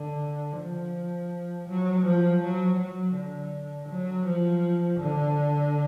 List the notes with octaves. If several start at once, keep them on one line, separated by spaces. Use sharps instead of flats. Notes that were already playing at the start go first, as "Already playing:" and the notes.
Already playing: D3
F3
F#3
F3
F#3
F#3
D3
F#3
F3
D3